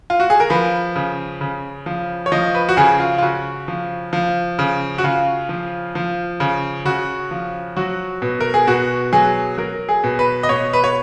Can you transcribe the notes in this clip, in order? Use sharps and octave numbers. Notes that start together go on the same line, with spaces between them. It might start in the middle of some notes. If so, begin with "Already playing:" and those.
F4
F#4
G#4
A#4
F3 B4
C#3
C#3
F3
C#5
F3 D#5
B4
F#4
C#3 G#4
F4
F4
C#3 F#4
F3
F3
C#3
F#4
C#3 F4
F3
F3
C#3
C#3 F#4
F3
F#3 F#4
B2
A#4
G#4
B2 F#4
F#3 G#4
F#3 A#4
G#4
B2
B4
D#5
B2 C#5
B4
C#5